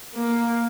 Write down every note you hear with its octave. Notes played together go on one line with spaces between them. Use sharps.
A#3